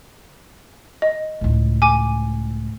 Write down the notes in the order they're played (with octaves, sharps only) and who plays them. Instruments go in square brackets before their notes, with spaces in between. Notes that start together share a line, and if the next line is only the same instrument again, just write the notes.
[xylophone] D#5
[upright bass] C#2 A2
[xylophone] G#5 D6 D#7